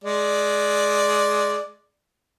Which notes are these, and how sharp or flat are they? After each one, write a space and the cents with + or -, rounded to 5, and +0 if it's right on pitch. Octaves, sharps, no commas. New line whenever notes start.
G#3 +15 D5 +0